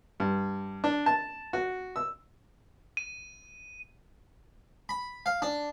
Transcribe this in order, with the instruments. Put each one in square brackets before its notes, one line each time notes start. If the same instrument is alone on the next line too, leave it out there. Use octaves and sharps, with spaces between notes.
[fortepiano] G2
D4
A5
F#4
E6
[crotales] D#7
[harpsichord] B5
F5
D4